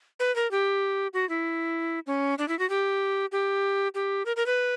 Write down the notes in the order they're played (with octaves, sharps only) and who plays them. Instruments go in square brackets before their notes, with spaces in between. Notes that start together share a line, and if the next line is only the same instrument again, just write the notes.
[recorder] B4
A#4
G4
F#4
E4
C#4
D4
E4
F#4
G4
G4
G4
A#4
A#4
B4